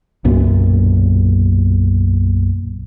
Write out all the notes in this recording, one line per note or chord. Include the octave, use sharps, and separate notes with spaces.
B1 F#2 A#2